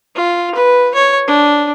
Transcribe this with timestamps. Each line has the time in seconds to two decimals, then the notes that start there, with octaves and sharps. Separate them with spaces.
0.15 F4
0.55 B4
0.95 C#5
1.27 D4